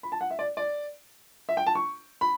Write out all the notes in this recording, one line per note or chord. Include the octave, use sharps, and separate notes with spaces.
B5
A5
F#5
E5
D5
D5
E5
G5
A5
C#6
B5